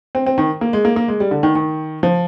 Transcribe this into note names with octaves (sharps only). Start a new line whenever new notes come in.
C4
C4
D#3
A#3
G#3
A#3
A#3
G#3
G3
D3
D#3
D#3
F3